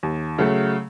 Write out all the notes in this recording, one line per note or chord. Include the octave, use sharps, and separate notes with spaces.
D#2
C#3 F#3 A3